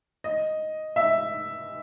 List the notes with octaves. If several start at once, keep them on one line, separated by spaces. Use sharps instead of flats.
D#5
E5